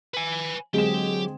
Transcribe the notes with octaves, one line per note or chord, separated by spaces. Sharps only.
B4 G#5
D3 F#3 G#3 C4 G4 G#4 E7